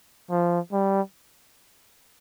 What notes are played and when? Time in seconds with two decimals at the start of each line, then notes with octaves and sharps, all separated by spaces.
0.31 F3
0.72 G3